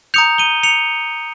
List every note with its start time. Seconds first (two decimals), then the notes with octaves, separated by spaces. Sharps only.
0.14 A#5 D#6 G6 C#7 F7
0.38 D#7 G7
0.63 C#7 F7